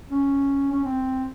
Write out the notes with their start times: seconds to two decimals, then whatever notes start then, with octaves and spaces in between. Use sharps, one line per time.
0.10 C#4
0.72 C#4
0.85 C4